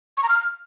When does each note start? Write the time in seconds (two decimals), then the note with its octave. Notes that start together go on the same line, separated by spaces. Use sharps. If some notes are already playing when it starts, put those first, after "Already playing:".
0.17 C#6
0.23 A#5
0.29 F6